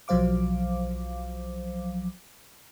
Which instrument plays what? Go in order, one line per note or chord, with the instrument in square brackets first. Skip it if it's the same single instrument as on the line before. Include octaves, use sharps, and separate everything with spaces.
[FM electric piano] B1 F3 F#3 C5 F5 D6